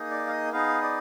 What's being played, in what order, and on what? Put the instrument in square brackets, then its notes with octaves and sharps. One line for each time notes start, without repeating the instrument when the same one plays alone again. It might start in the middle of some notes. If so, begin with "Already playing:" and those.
Already playing: [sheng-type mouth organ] A#3 D#4 G#4
D5
F5
D#5
B3 D#4 G#4 F5
D5